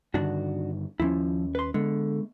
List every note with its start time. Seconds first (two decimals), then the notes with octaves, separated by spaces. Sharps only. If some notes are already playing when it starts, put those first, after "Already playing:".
0.14 G2 D3 D#3 D4 F#4
1.00 D#2 F3 G#3 C#4 E4
1.55 B4 C6
1.74 D3 G#3 B3